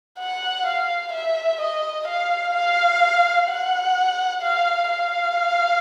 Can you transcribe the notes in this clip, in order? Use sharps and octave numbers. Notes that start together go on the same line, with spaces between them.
F#5
F5
E5
D#5
F5
F5
F#5
F5
F5